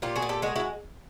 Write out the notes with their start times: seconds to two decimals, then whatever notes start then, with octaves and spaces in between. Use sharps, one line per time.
0.02 A#2 F4 G4
0.16 F#4 G#4
0.22 A#2
0.29 G4 A4
0.42 G#3 F#4 G#4
0.56 E4 F#4